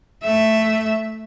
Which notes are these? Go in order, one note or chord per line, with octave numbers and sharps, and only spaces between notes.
A3 E5